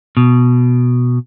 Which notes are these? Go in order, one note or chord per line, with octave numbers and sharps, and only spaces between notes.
B2